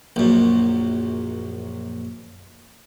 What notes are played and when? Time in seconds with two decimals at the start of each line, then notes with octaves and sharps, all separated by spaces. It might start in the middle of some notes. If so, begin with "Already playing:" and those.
0.16 A#1 F#2